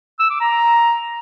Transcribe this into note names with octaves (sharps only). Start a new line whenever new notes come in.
E6
D6
A#5